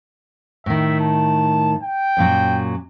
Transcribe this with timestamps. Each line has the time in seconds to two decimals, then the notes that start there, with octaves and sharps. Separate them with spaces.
0.66 A2 D#3 E5
1.00 A5
1.83 G5
2.17 F#2 A#2 F#3